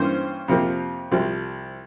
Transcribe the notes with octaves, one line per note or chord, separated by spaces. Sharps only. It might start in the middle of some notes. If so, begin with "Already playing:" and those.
Already playing: G2 E3 A#3 C#4 C5
F2 C3 F3 A#3
C2 C3 F3